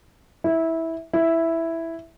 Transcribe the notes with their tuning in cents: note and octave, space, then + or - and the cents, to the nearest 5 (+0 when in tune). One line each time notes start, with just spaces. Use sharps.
E4 -15
E4 +0